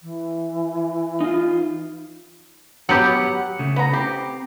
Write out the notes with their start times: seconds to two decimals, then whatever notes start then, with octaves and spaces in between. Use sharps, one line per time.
0.01 E3
1.21 D#4 F4
2.89 F#3 B3 G4 F#5
3.59 C#3 A3
3.76 B3 A#5
3.93 C4 G4